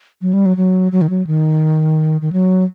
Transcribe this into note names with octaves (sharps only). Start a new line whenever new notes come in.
F#3
G3
F#3
F#3
F#3
D#3
F#3
D#3
D#3
F#3